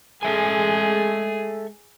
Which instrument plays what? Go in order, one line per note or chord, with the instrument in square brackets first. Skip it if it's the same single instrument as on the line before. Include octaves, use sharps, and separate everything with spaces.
[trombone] G#3 [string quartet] G#4 [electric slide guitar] A4 E5 G#5